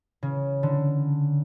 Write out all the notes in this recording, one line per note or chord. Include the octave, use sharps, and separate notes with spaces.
C#3
D3